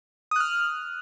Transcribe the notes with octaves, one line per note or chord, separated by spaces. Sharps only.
D#6 F6 F#6